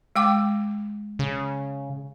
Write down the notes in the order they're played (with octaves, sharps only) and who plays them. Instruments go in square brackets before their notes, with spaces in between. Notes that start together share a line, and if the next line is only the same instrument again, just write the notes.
[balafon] G#3 G5 D6
[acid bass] C#3